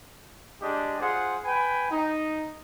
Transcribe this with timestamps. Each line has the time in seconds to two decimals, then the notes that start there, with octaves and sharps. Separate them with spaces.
0.61 G#3 D4 G4 D#5
1.00 F4 G#4 C5 F#5
1.44 B4 G5 G#5 B5
1.91 D#4